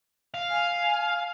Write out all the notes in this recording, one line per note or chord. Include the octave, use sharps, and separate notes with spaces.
F5
G#5